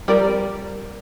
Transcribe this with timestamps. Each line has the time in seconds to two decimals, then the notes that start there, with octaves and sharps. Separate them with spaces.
0.08 F3 G3 C4 A#4 D5